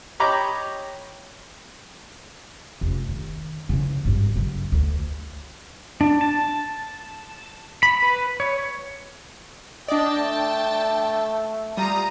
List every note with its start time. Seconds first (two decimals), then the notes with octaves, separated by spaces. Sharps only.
0.20 G4 C#5 D#5 A#5 B5 D6
2.81 F1 C#4
3.09 D#3
3.69 C#3 E3
4.05 G#1 G2
4.36 F#2 C#3
4.72 D2
6.01 D4
6.21 A5
7.83 B5
8.02 B4
8.40 C#5
9.88 D4 D5 D#5 G5 A5
10.18 A3
11.77 G3 F4 A#5 D#6